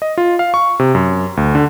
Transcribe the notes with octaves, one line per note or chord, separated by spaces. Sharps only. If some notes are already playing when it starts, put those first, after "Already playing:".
D#5
F4
F5
C#6
C3
F#2
D2
D3